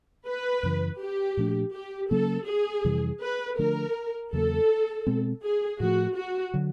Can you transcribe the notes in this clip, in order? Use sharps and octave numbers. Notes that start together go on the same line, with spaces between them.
B4
F#2 C#3 E3
G4
A#2 F3 A3 D4
G4
C#3 F#3 A#3 C#4 A4
G#4
F2 C3 E3 G3
B4
D3 F3 A3 D4 A#4
E2 C#3 F#3 A#3 A4
B2 G#3 C4
G#4
A2 F3 A3 F#4
F#4
D3 F#3